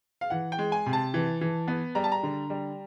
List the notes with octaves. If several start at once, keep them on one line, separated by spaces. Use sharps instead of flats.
F5
E3 F#5
G5
G#3
G#5
C3
A5
E3
E3
B3
G3 A#5
A5
A#5
D3
G3